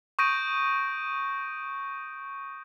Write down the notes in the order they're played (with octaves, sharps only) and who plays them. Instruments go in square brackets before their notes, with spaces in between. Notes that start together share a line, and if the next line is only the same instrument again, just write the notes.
[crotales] C#6 D#6 G6 A#6 D7 D#7